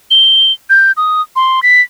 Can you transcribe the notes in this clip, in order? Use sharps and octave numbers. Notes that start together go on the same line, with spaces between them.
G7
G6
D#6
C6
B6